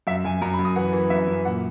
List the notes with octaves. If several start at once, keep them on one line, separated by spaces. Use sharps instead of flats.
F#2 E5
F#2 G#5
F#2 A#5
B5
F#2
D#6
E3 F#5
E3
F#2 E5
F#2
A#2 F#5